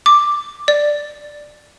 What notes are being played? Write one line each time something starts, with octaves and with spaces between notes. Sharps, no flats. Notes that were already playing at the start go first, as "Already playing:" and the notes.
D6
D5